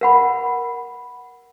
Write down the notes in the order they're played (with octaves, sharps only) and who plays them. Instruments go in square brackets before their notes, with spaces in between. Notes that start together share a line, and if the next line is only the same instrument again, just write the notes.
[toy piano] A#4 F#5 B5